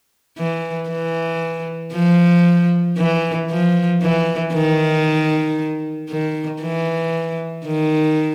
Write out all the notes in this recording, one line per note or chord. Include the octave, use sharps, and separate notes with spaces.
E3
E3
F3
E3
F3
E3
D#3
D#3
E3
D#3